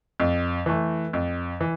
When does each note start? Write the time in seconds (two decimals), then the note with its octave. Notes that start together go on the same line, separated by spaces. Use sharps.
0.20 F2
0.66 E3 A3
1.13 F2
1.61 E3